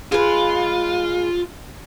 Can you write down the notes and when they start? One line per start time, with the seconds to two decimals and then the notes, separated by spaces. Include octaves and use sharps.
0.12 G#3 F4 B4